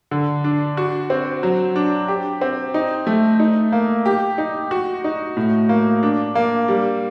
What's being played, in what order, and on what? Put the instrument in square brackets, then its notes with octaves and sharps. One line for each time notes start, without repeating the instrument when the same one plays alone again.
[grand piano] D3
D4
F#4
C4
F#3
D4
G4
C4
D#4
A3
D#4
A#3
G4
D#4
F#4
D#4
A2
A#3
D4
A#3
G3